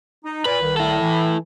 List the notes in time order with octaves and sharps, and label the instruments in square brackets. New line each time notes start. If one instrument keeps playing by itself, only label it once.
[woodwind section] D#4
[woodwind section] A#2 [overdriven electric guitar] B4
[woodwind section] C2 D#3
[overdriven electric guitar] E4 A4
[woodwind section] E3